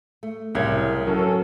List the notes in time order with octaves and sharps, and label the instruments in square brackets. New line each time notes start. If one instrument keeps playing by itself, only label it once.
[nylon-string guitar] A3
[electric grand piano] C2 G#6 [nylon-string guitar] F#2 A2 C#3 [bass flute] A#4
[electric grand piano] F#3 [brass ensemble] C#4 A4